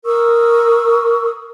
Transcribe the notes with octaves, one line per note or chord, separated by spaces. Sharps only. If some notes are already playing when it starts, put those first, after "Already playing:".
A#4 C#6 D#6 E6